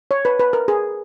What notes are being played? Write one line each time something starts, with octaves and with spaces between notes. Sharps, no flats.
C#5
B4
B4
A#4
G#4